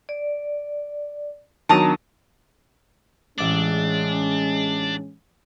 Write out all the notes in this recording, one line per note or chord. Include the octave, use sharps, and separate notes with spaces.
D5
D#3 F#3 B3 D4 A5 A#5 D#6
A1 G#3 C#4 D4 D6